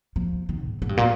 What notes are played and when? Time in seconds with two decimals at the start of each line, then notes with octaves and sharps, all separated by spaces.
0.16 F3
0.49 D#3
0.65 G#2
0.82 G#2
0.89 G2
0.97 A#2